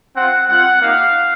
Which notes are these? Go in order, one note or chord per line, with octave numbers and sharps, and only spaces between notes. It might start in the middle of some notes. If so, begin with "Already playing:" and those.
C4 F4 F#5
G3 C4 F4 F#5
A#3 D#4 G4 F5